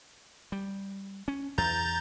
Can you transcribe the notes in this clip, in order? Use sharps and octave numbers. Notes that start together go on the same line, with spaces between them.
G3
C#4
E2 A#5 G6 A6